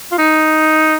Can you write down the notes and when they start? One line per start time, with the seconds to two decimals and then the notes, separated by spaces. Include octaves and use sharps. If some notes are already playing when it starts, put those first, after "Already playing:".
0.12 F4
0.18 D#4